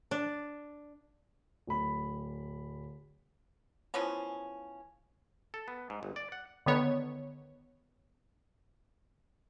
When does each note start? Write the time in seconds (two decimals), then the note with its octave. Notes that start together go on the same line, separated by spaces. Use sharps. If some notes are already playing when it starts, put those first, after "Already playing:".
0.11 D4
1.67 D1 B5
3.94 E3 F3 B3 C#4
5.54 A4
5.68 B3
5.90 G#2
6.03 G1
6.16 D5
6.32 F#5
6.66 D3 D#3 B3 C#5